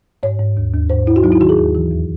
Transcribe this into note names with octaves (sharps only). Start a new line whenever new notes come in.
G#2 C#5
G#2
D#2
D#2
G#2 C5
G#2 E4
F#4
F#3 D#4
E4
D#3 F#4
G#4
D#2
E3
E2